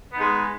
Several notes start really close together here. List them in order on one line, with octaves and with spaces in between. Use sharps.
B3 D#4 G#3